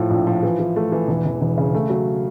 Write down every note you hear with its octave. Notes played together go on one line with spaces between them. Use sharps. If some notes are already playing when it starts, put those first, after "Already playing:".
Already playing: A2 F3
A#1
F3
E3
E3
A3
E3
E1
E1
E1
C#3
A3
F#3